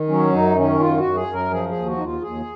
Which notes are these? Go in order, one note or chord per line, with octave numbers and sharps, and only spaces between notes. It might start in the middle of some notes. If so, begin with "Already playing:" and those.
Already playing: D#3
F#3 C#4
F#2 D#4
D#3 C#4
F#2 F4
F#4
F#2
G#4
F#2
A#4
F3 G#4
G#4
D#2
F#4
D#2 D#4
F4
D#2 G#4